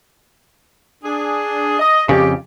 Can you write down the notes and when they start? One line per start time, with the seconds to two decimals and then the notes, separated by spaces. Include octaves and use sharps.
1.04 D4 G#4
1.79 D#5
2.09 F2 C#3 G4